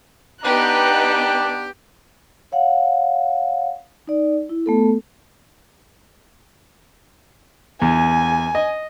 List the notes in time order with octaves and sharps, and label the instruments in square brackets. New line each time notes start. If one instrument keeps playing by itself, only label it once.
[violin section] B3 D#4 B4 [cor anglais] D4 [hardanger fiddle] G4 G5 [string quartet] A#5 F#6
[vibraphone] C#5 F5 F#5
D#4 D5
E4
A3 B3 A4
[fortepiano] E2 [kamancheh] G#5
[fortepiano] D#5